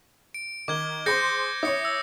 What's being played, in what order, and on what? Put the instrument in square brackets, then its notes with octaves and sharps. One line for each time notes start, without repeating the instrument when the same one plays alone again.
[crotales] D7
[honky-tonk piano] D#3 [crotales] D6 G#6 G7
[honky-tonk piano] G#4 C5 C6 [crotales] G6 A#6 C#7
[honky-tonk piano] E4 C#5 [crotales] D#6 C#7
[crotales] E6